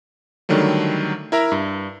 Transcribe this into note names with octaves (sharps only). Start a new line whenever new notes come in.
D3 D#3 F#3 G3 A3
E4 A#4 E5 A#5
G2